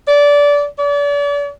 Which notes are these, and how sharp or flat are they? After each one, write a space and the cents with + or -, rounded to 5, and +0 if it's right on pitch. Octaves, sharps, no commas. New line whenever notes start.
D5 -20
D5 -40